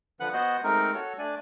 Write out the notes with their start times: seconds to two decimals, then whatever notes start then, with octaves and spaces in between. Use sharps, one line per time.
0.20 D3 F3 B4 F#5 F#6
0.33 B3 F#4 C5 D#5 F#5
0.64 G#3 A3 C4 D#4 A#4
0.94 F#4 A4 C#5
1.19 A3 D4 D5 G#5